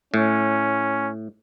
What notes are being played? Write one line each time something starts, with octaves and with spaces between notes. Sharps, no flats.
A2 C#4